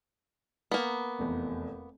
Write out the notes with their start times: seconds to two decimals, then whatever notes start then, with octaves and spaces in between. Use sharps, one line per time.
0.72 A#3 B3
1.19 F1 E2